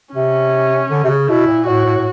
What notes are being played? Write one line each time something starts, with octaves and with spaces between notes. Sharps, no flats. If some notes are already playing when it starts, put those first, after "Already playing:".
C3 C#4
D3
C3
C#3
B2 E4
A#2
A2 F#4
A2
A2